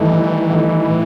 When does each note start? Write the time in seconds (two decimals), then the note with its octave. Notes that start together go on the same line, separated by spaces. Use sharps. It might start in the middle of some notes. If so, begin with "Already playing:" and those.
Already playing: G2 D#3 E3 A3 D#4
0.12 G2
0.50 D#3 A3 D#4
0.87 A2